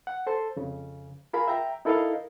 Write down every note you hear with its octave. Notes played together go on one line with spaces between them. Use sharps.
F#5
A4 C5 A5
F2 C#3
F4 G#4 A#4 F5 A#5 B5
E5 G5 A#5
D#4 E4 A4 A#4 D#5 F5